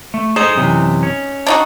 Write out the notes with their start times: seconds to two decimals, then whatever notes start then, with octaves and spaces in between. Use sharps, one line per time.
0.14 A3
0.36 D#4 G#4 A4 C5
0.55 F#2 C3 E3
1.03 C#4
1.47 D4 D#4 F#4